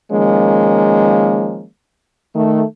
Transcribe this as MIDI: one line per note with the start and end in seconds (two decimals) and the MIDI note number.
0.12 1.66 51
0.12 1.66 53
0.12 1.66 56
0.12 1.66 58
0.12 1.66 61
2.35 2.64 51
2.35 2.64 57